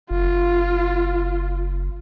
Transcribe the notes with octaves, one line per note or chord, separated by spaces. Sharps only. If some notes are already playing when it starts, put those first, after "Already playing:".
F#1 F4